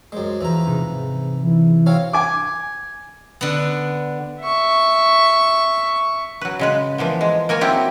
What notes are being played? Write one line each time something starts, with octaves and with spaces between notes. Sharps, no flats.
F#2 G#3 C5
E2 E3 F3 A#5
G#2 C3 D#4
E3
C4 C#4 F#4 F5 G#5
G#5 D6
D3 B3
E5 C#6
F#3 B4
C#3 G#3 B4
E3 F3 A#3 B3
G#3
A#3 A#4 C#5 G#5
F#3 C4 E4 F4 G4